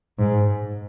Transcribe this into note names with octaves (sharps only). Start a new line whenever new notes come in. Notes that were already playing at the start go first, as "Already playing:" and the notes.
G#2